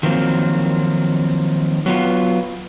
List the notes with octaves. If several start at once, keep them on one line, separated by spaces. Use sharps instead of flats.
D#3 F3 F#3 A#3 C4
F#3 B3 F4